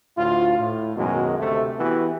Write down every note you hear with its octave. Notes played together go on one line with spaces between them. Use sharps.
D2 A2 F4
A2
F#2 B2 D#3 G#3
D2 C3 A3
E3 B3 E4 F#4 G4